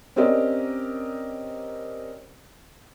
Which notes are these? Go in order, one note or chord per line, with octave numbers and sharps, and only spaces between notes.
C4 C#4 G4 A#4 D5 D#5